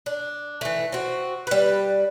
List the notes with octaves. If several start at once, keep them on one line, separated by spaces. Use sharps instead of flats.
D4
E3 A3
C4 F#4
G3 B4